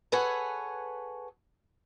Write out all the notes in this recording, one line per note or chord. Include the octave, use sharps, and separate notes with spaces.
G#4 A4 B4 C#5 F#5 G#5